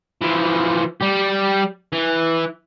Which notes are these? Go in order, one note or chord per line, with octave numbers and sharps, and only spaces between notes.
E3 F3
G3 G4
E3